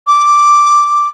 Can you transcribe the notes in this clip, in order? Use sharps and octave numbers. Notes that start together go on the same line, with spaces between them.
D6